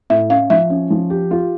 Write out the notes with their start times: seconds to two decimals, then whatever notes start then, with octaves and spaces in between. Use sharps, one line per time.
0.10 A2 E5
0.29 C#4 F5
0.50 F3 E5
0.70 C#4
0.90 F3
1.10 G4
1.31 F4